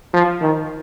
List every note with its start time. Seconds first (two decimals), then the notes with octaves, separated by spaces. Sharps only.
0.14 F3
0.42 D#3